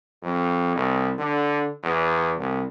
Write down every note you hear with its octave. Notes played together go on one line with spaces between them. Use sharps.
F2
C2
D3
E2
C2